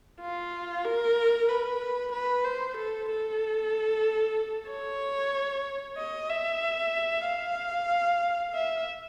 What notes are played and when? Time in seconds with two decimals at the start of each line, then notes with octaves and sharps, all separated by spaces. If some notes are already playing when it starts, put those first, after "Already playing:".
0.21 F4
0.85 A#4
1.49 B4
2.12 B4
2.45 C5
2.77 A4
3.10 A4
4.69 C#5
5.98 D#5
6.30 E5
7.26 F5
8.55 E5